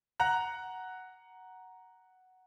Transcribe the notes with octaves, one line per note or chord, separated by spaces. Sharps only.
F#5 A#5 F#6